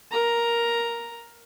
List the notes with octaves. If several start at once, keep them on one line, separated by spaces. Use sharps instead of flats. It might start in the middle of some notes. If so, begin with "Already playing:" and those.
A#4 A#5